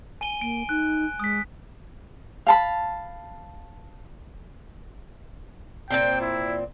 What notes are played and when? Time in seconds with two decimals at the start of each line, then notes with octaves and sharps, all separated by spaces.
0.21 G#5 D#7 G7
0.41 A#3 D7
0.69 D#4 F#6
1.20 G#3 D#6 B6
2.47 F5 A5 B5
5.91 A#2 C#3 C4 G5
6.21 E4